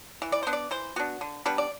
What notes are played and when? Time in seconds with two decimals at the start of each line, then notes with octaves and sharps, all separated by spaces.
0.22 E3
0.32 D5
0.43 B3 D4 C5
0.53 D5
0.71 E3 C5
0.96 B3 D4 F#4
1.21 D3
1.46 G3 B3 D4 B4
1.58 D5